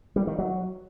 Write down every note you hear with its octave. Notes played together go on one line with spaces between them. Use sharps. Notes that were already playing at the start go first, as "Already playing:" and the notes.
G3
D#3
F#3